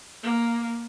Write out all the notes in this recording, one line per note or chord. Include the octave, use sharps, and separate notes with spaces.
A#3